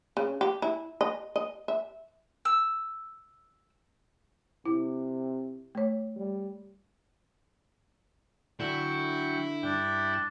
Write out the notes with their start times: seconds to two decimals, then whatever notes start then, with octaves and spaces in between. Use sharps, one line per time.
0.17 C#3
0.41 G4
0.62 E4
1.01 D#5
1.36 D#5
1.68 E5
2.45 E6
4.65 C3 E4
5.75 A3 C#5
6.16 G3
8.60 D3 F#3 E4 G5 C#6
9.63 G2 D4 G5